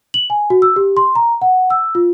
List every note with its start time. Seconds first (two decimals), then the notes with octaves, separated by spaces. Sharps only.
0.14 F#7
0.30 G#5
0.50 F#4
0.62 E6
0.76 G4
0.97 C6
1.15 A#5
1.42 F#5
1.70 E6
1.95 F4